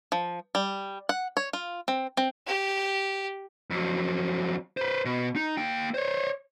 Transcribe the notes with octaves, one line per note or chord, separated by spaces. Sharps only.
F3
G3
F#5
C#5
F4
C4
C4
G4
F2 F#3
B4 C5
B2
D#4
A#3 G5
C5 C#5